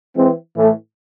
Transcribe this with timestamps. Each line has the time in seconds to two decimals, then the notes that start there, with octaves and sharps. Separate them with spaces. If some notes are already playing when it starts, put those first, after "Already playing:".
0.16 E3 G#3 C4
0.56 A2 E3 A3